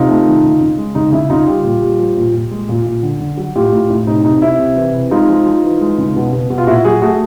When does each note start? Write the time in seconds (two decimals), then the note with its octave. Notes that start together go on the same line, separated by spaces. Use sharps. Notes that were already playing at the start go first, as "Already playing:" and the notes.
Already playing: C3 D#4 F4
0.09 A3
0.26 D#3
0.44 C#3
0.61 C#3
0.78 G#3
0.95 C#3 D#4
1.12 C#3 E4
1.30 C#3 D#4 F4
1.47 G3 F4 G4
1.64 A#2
1.82 G3
1.99 F3
2.17 A#2
2.34 A#2
2.51 G#3
2.69 A#2
2.86 A#2
3.03 D3
3.20 D3
3.37 F#3
3.55 A2 F4 G4
3.72 A2
3.90 A2
4.07 C3 D#4
4.25 C3 D#4
4.42 C3 E4
4.59 C3
4.76 E3
4.93 C3
5.11 G#3 D#4 F4
5.28 F3
5.46 F3
5.64 E3
5.81 G#3
5.98 C#3
6.16 B2
6.33 B2
6.50 B2
6.58 F4
6.67 A#2 E4 F#4
6.84 F#3 F#4 G#4
7.02 A3 F#4 G#4